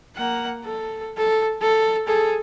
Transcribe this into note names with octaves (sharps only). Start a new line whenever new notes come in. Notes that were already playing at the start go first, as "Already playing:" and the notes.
A#3 F#5
A4
A4
A4
G#4 A4